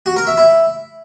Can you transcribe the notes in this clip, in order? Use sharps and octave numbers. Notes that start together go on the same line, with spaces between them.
F#4
A#4
E5
E4